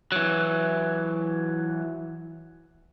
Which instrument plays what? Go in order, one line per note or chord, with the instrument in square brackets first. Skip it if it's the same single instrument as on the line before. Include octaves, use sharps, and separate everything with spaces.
[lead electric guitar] E3 F#3